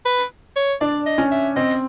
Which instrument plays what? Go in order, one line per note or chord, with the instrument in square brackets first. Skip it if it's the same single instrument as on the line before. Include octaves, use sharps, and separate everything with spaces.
[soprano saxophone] B4
C#5
[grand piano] D4 [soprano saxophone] D5
[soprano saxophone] D#5
[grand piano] C#4
[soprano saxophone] E5
[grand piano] C4 [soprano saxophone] D#5